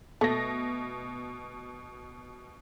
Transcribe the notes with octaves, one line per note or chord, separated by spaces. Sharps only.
B2 A3 A#6